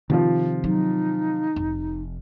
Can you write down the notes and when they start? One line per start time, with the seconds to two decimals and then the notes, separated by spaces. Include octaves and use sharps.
0.10 C3 D#3 F3 F4
0.64 F#3 D#4
1.56 F1